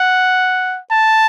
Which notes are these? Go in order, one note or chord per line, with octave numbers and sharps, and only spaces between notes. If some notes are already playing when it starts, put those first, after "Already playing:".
Already playing: F#5
A5